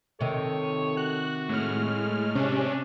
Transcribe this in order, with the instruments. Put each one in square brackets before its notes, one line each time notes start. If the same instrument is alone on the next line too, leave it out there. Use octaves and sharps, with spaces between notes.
[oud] C3 D#3 [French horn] A4 [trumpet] C#5
[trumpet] F#4 [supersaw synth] F#6
[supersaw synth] A2 F6 [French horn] G#3
[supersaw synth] C3 C#4 [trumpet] D4